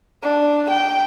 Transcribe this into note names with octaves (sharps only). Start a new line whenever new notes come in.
D4
G5